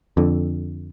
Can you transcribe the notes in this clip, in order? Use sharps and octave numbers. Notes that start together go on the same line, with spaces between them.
F2 D3